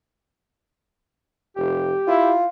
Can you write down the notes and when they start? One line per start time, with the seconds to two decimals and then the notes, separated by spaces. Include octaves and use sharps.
1.57 F1 G4
2.07 E4 F4